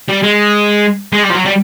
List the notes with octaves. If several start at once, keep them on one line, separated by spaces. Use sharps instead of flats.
G3
G#3
G#3
G3
F3
F#3
G3